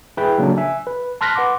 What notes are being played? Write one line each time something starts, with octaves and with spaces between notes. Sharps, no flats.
E4 G#4 B4 E5 G5
C#3 F#3 A3 A#3 D4
E5 G#5
B4
A5 C6 F6 F#6 A#6 B6
B4 F#5 C6 D6